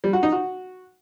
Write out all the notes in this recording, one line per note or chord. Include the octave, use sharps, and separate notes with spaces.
G3
F#4
D#4
F#4